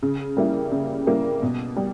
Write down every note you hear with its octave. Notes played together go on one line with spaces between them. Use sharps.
C#3
G3 A#3 E4
C#3
G3 A#3 E4
B2
G3